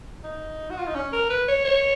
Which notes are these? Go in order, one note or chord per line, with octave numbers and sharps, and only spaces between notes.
D#4
F#4
F4
D#4
C#4
A#4
B4
C#5
C#5